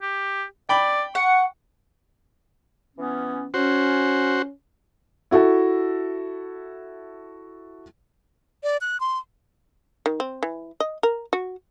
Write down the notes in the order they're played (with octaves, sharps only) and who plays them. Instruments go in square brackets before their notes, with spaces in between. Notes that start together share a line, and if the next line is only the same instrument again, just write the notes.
[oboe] G4
[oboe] D5 [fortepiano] G5 B5
[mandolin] F#5 [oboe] C#6
[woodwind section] E3 B3 C#4
[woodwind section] C#4 [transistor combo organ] F#4 C5
[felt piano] E4 F#4 A4 E5
[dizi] D5
F#6
C6
[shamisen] D#3
C4
E3
D#5
A#4
F#4